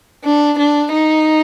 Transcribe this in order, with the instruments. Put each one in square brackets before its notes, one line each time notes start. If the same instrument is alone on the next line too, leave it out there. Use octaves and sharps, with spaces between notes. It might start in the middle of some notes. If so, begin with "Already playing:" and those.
[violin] D4
D4
D#4